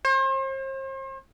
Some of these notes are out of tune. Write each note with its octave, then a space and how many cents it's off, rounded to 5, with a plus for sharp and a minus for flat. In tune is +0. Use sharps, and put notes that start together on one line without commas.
C5 +40